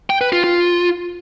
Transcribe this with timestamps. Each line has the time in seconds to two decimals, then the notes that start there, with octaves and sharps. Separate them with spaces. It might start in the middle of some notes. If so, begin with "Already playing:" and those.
0.10 G5
0.21 B4
0.33 F4
0.44 F4